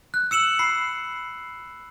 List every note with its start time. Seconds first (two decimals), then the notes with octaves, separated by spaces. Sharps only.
0.14 F#6
0.31 E6 C#7 E7 F#7
0.59 B5 C7